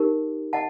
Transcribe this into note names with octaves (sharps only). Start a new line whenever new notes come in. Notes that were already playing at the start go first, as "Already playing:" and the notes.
Already playing: D#4 G4 A#4
D#5 F#5 A5